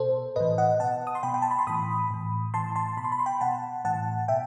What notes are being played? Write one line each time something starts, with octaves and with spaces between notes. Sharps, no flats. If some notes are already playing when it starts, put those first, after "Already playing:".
Already playing: B2 A4 C5
A2 E3 B4 D#5
D#5 F#5
B2 F#5 A5
D#6
C6
B2 G5 B5
G5
A5
B5
C6
A2 E3 B5 D#6
A2 E3
A2 E3 A5 C6
A5 C6
B2 B5
C6
B5
C6
G5 B5
B2 F#5 A5
A2 E3 F#5 A5
B2 E5 G5